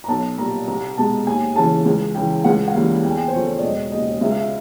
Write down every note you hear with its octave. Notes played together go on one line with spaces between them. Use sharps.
A#5
B1 A5
A#2 G3 A#3 A#5
C2 A#5
B2 G#3 A5
D#2 G#5
C#3 E3 A5
C#2
C#3 E3 G5
C#2 F#5
F#5
C#3 E3 G3 A#3 F5
E2 G5
G#5
G5
C5
C#3 F3 A3 C#5
D5
E1 D#5
D#2 C#3 D#5
C#2 E5
F5
E5